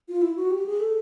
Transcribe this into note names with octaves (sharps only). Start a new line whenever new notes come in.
F4
E4
F#4
G4
G#4
A4